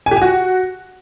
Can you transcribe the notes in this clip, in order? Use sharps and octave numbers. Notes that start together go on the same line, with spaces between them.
G#5
G4
G#5
F#4